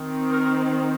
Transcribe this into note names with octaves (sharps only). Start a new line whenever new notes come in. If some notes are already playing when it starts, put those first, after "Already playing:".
Already playing: D#3 C4
A#4